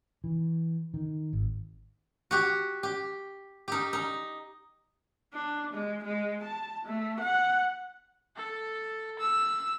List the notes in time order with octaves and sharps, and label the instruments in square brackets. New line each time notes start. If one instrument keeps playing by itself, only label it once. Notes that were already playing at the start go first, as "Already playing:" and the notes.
[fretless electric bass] E3
D#3
G#1
[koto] F#4 G4
G4
D#4 G4
D#4
[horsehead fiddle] D4
G#3
G#3
A5
A3
F#5
[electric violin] A4
E6